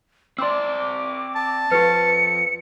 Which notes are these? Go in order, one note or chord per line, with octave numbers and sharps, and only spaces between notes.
C4 D5 C6 D6 E6
A5
F2 G4 B4 C#7